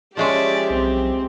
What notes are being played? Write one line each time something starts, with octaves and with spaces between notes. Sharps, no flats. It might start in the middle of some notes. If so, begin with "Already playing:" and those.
F3 G#3 C#4 G4 D5 E5
B1 C4